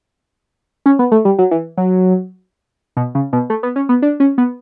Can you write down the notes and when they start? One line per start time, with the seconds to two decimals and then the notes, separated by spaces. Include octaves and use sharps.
0.86 C#4
0.99 B3
1.12 A3
1.25 G3
1.38 F#3
1.51 E3
1.77 F#3
2.97 B2
3.15 C#3
3.33 B2
3.50 A3
3.63 B3
3.76 C#4
3.89 B3
4.02 D4
4.20 C#4
4.38 B3